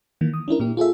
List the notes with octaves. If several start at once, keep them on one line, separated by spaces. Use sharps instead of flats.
D#3 E3 A#3
D#6
C#4 D4 E4 A#4
A#2 A#3 G4
F4 G#4 A4 E5